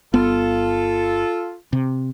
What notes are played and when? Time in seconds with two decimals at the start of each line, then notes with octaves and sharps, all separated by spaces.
0.14 G1 B3 F4 A4
1.73 C3